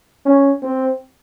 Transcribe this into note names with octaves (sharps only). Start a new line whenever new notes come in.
C#4
C4